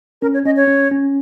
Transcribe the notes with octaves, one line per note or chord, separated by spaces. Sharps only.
C#4 A#4
C#5
C#4 D#5
C#5
C#4
C#4